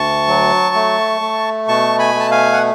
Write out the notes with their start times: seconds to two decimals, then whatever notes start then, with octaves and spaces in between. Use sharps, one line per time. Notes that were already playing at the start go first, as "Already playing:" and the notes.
Already playing: D2 A5 C#6
0.28 F#3
0.75 A3
1.21 A3
1.68 B2 A5 C#6
1.99 G#5 B5
2.15 A3 A5
2.31 F5 G#5
2.53 F#5